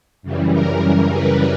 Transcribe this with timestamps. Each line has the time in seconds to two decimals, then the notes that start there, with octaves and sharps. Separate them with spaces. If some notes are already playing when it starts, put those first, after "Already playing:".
0.22 F#2 C#3 E3 G3
0.52 A#4
0.82 A#4
1.11 B4